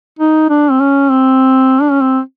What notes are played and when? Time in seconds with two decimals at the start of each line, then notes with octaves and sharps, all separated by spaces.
0.19 D#4
0.50 D4
0.71 C4
0.80 C#4
1.11 C4
1.82 D4
1.91 C#4
2.01 C4